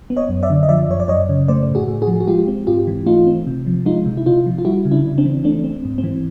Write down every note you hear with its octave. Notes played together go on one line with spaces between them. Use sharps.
B3
C#5 D#5
F#2
D5 E5
D3
D#5
F3 D5 E5
F#2 C#5
D5
F#2 C#5 D#5
C#3
A3 C5 D5
A2
F#4 G#4
A2
F#4 G#4
F3
F#4
G#3 F4 G4
C4
G#2 F4 G4
E3
A3 D#4 F4
C4
C3
F3
G#3 D#4 F4
C3
E4
C3 D#4 F4
F3
F4
G3 E4 F#4
C#3
D4 E4
C#3
C4 D4
E3
A3 C4 D4
C4
G#2
C4
E3